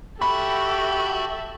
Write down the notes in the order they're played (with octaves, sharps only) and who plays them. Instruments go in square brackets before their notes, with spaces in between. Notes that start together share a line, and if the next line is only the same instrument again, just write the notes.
[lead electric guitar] F#4 [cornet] G4 [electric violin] A4 E5 [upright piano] B5